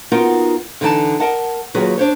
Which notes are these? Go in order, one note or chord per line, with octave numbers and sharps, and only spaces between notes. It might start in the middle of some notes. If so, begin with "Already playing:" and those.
B3 D#4 F4 F#4 A#4 F#5
D3 E3 D#4 E4 A5
A#4 D#5 F#5 A5
D#2 F#3 F4 F#4 G#4 B4
D4 C5 C#5